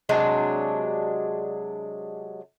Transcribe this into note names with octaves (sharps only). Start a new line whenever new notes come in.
C3 F#3 G#3 D4